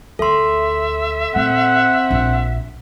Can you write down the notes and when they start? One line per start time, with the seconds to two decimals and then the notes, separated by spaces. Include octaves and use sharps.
0.19 D2 A4 E5 C6
1.35 A#2 C4 F#5
2.11 A#1